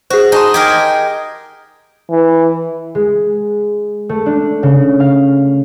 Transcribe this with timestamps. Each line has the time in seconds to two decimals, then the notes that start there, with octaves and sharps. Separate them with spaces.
0.10 F#4 G#4 C5
0.32 D#4 G#5 A5 C6
0.54 G4 G#4 A#4 G#6
2.10 E3
2.95 G#3
4.09 A3
4.26 D4
4.63 C#3
5.00 F5